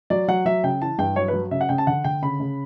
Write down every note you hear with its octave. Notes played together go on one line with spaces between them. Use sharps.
F#3 D5
F#3 F#5
F#3 E5
C#3 G5
E3 A5
G2 G5
F#3 C#5
B4
F#3
C#3 E5
F#5
C#3 G5
A5
D3 F#5
D3 G5
C#3 B5
C#3